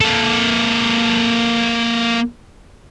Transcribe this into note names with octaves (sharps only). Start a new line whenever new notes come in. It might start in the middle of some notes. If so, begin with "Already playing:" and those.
A#3 A4